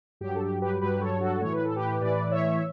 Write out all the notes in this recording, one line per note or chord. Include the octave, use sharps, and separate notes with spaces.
G2 F#3 G4
A4
G4
G4 B4
G2 F#3 G4 B4
A4 C#5
F#4 A4
A2 E3 C#5
B4
A4
G4 B4
A2 E3 B4 D5
C#5 E5